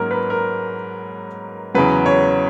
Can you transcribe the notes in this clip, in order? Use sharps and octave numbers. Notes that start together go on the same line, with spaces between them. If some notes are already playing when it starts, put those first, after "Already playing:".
Already playing: G#2 F#3 A#3 C#4 A#4
B4
A#4
E2 C#3 F#3 B4
C#5